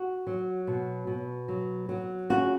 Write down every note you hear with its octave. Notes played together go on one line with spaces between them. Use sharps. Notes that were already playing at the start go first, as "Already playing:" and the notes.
Already playing: F#4
F#3
B2
B2
F#3
F#3
C#3 F#4